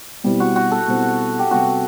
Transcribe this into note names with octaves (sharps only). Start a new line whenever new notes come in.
B2 G3 C4 E4
F#4
F#4
A4
B2 G3 C4 E4
G4
C3 G3 B3 F#4